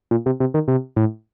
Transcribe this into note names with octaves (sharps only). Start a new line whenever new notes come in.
A#2
C3
C3
D#3
C3
A2